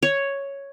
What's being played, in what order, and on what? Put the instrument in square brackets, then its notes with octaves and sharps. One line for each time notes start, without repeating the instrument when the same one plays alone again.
[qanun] C#5